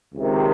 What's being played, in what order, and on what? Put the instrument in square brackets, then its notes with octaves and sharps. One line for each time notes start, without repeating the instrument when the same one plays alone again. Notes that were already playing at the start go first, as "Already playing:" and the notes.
[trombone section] C#2 C3 D#3